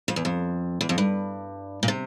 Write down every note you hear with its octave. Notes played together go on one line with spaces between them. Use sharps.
F2
E2
F2
E2
F2
G2
A#2
C3